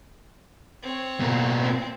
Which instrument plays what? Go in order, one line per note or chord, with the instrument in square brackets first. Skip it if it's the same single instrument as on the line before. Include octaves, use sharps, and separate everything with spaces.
[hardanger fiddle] C4 C#5
[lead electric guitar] B2 A#3
[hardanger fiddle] C4